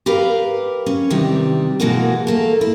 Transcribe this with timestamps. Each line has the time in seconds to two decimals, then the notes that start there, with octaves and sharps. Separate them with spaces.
0.06 G4 A#4 B4 F5
0.86 C#4
1.10 C3 D#3 E3 G3
1.80 B2 E3 G#3 A#3 F#4
2.27 A3 A#3 A4
2.61 E4